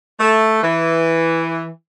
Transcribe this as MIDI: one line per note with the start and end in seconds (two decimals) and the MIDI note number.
0.20 0.62 57
0.63 1.68 52